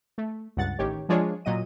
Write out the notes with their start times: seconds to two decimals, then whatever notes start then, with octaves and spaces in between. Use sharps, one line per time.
0.18 A3
0.57 C#2 G2 F#5 A6
0.79 A1 D#3 G4 C#5
1.09 F3 G#3 D4 F4 G#4 C#5
1.45 A#2 F#3 D#5 D#7